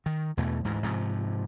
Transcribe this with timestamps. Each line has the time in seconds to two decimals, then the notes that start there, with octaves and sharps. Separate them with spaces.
0.06 D#3
0.37 E2 B2 E3 A3
0.64 D2 G#2 E3
0.83 G#2 C3 F3